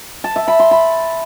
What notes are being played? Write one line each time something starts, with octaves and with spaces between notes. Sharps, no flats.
A5
E5
B5
C6
B5